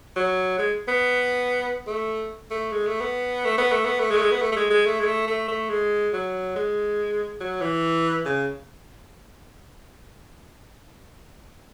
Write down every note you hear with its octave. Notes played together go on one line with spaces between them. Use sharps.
F#3
G#3
B3
A3
A3
G#3
A3
B3
A3
B3
A3
B3
A3
G#3
A3
G#3
B3
A3
A3
G#3
G#3
A3
G#3
A3
A3
A3
G#3
F#3
G#3
F#3
E3
C#3